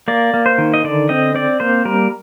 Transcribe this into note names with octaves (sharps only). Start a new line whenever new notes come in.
A#3 D5
A#3
C5
D#3
D#5
D3 D5
C4 D#5
C4 D5
A#3 C5
G3 A#4